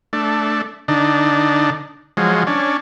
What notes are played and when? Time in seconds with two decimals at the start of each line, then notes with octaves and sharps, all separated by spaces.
0.13 A3 D4
0.88 D3 D4 D#4
2.17 F3 F#3 G#3
2.47 C#4 D4